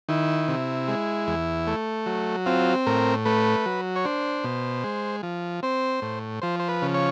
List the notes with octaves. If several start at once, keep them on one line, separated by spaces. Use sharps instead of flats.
D#3 E4
C3
G#3
E2
A3
F#3
C4 F4
A2 A#4
A3 B4
F#3
C#5
D4 C5
B2
G#3
F3
C4 C5
A2
F3 C5
C5
B4
C#3
C#5